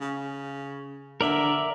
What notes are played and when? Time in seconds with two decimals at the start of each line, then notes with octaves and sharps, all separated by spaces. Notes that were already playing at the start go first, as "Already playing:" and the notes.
0.01 C#3
1.21 D3 A#4 D5 E5